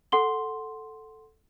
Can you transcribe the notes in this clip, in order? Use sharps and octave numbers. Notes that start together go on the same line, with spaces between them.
A4 F#5 C6 G7